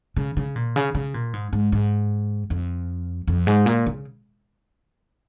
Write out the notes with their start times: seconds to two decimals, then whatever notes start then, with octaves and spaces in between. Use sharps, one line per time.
0.17 C#3
0.37 C#3
0.56 A#2
0.76 C#3
0.95 C#3
1.14 A#2
1.33 G#2
1.53 G#2
1.72 G#2
2.50 F2
3.28 F2
3.47 G#2
3.66 A#2
3.86 C#3